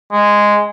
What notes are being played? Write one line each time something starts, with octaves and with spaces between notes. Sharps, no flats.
G#3